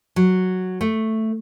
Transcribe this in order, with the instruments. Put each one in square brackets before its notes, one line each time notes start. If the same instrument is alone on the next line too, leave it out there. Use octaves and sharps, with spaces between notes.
[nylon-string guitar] F#3
A3